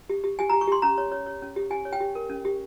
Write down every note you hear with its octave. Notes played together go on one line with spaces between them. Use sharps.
G4
G4
G4 G#5
G4 A#5
C#6
G4 C6
C#4 A#5
C#5
C#5
C#5
C#4
G4
G4 G#5
C#5
G5
G4
A#4
C#4
G4